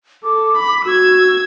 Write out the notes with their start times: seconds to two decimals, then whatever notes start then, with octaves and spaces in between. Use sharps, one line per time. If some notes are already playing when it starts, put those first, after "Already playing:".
0.23 A4 D6
0.56 B5
0.85 F#4 E6 G#6